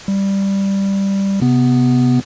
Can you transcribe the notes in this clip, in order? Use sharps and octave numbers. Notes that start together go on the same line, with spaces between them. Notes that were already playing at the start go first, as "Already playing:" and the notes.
G3
C3 B3